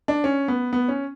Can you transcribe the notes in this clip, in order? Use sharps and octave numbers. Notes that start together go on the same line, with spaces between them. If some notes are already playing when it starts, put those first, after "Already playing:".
D4
C#4
B3
B3
C#4